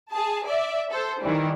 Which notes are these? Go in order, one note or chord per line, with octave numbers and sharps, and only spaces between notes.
G#4 A5
D5 E5
A4 C5
D#3 E3 G3